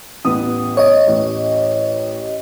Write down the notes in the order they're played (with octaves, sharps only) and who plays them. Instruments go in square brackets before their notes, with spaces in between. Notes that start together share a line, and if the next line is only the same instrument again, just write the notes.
[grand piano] A1 B3 D#6
[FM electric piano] C#5 D#5
[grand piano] A1